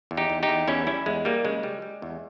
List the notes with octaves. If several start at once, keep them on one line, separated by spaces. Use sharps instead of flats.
E2
D#4 G4
E2
D#4 G4
E2
E2 C#4 E4
G3 C#4 E4
E2 G#3
G3 A#3
C#3 G#3
G3
G3
E2